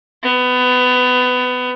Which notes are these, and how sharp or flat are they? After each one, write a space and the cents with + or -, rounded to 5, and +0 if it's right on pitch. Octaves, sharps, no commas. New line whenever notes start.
B3 +20